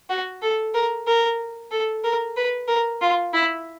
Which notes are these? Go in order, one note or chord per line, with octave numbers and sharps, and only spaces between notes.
F#4
A4
A#4
A#4
A4
A#4
B4
A#4
F4
E4